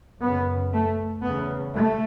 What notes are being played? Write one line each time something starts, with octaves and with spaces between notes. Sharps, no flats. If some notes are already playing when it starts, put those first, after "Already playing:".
F#2 C#3 B3
A3
E2 C#3 B3
A3